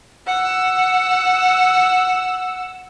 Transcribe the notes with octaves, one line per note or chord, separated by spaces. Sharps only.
F#5 E6